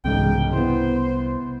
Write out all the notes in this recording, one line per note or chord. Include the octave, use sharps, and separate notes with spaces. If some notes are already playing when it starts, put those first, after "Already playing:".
E1 C2 G#2 C#3 G5
B3 E4 C5